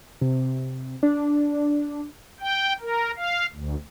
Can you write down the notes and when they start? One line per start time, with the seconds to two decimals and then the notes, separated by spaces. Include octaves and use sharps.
0.21 C3
1.03 D4
2.40 G5
2.81 A#4
3.16 F5
3.53 D2